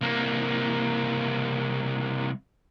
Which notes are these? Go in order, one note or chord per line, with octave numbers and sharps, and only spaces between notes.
C2 A#3